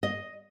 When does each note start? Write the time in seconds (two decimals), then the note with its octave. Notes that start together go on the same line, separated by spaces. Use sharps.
0.03 D#5